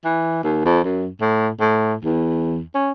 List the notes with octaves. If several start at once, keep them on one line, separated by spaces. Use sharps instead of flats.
E3
D#2
F2
F#2
A2
A2
E2
C#4